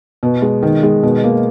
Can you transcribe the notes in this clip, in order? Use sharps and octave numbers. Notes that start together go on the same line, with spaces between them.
B2
G#3
D#3
G#3
B2
A#3